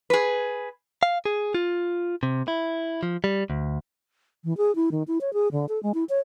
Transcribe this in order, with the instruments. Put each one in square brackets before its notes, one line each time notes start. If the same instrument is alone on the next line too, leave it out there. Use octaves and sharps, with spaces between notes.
[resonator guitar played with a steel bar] G#4 B4
[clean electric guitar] F5
G#4
F4
C3
E4
F3
G3
D2
[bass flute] E3
G#4
E4
D#3
E4
C#5
G#4
D3
A4
G#3
E4
C#5